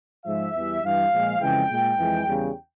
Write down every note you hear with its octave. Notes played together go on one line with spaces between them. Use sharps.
G#2 F3 G#3 E5
E2 E3 G3
G2 E3 G3 F5
A#2 F3 G#3
F2 C#3 E3 G#3 G5
A#2 G#3
F2 E3 G#3
E2 C#3 G3